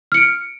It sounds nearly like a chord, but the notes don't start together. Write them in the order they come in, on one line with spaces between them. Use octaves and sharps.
F6 C#7 D7